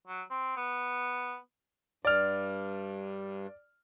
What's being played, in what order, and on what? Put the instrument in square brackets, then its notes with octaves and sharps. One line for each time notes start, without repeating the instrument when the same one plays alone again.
[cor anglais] F#3
C4
B3
[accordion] G2 [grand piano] D5 F6